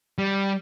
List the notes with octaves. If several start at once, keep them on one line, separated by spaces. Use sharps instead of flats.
G3